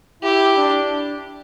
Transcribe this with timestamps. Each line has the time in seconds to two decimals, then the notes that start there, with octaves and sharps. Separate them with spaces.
0.23 E4 G4
0.57 D4